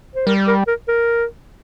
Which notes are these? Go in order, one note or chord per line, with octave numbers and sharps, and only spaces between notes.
C5
G3 A#4
A#4
A#4
A#4